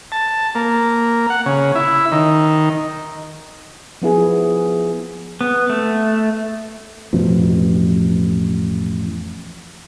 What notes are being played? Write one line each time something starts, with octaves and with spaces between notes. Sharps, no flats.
A5
A#3
F#5
C#3
E4
D#3
F3 B3 E4 G#4
B3
A3
A1 F2 B2 F3